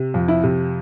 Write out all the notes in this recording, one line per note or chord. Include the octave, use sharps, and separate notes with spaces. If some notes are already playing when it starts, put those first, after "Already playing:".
Already playing: C3
F2
E4
C3